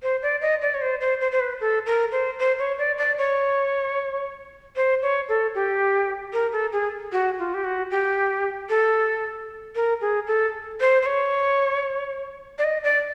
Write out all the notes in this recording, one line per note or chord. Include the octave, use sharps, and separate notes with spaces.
C5
D5
D#5
D5
C#5
C5
C5
C5
C5
B4
A4
A#4
C5
C5
C#5
D5
D5
C#5
C5
C#5
A4
G4
A#4
A4
G#4
F#4
F4
G4
F#4
G4
A4
A#4
G#4
A4
C5
C5
C#5
D5
D#5
D5